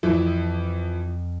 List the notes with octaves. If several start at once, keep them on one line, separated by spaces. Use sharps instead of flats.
F2 E3 F3 E4 E6